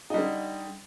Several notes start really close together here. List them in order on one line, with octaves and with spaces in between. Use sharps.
D#4 G3 D3